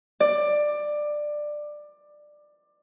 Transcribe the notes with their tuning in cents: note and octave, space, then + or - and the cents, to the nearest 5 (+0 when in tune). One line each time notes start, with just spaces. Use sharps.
D5 +15